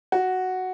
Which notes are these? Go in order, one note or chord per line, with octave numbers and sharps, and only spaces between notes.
F#4